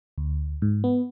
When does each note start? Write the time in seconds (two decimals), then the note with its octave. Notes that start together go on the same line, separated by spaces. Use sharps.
0.18 D2
0.62 G#2
0.84 B3